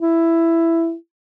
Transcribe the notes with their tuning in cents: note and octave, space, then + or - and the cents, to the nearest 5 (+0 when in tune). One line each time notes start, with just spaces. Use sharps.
E4 +10